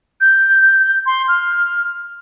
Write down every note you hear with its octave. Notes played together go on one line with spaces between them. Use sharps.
G6
C6
F6